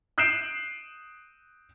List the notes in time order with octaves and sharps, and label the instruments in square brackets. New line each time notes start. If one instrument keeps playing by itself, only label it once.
[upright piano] D#6 F#6 G6 C7 D7 E7